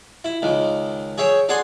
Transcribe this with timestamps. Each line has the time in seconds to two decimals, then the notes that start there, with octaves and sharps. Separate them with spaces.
0.24 E4
0.42 C#2 D#3
1.18 G#4 C#5 E5 G5
1.49 D4 G#4 F#5 G#5 C6